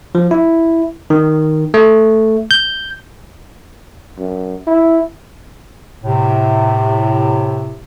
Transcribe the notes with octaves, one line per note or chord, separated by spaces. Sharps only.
F3
E4
D#3
A3
G6
F#2
E4
A2 C3